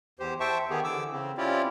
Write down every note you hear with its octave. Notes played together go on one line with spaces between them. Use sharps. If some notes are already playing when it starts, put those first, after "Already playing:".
E2 G4 C5
C5 E5 G5 A5 C#6
D#3 B3 G4 G#4
D3 E3 D6 E6
C#3 C4
C4 C#4 E4 F4 G4 D5